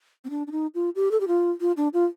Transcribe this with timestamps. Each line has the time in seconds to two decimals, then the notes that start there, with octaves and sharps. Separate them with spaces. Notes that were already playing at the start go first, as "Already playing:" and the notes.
0.25 C4
0.30 D4
0.47 D4
0.52 D#4
0.75 F4
0.95 G4
1.11 A4
1.20 G4
1.28 F4
1.61 F4
1.77 D4
1.94 F4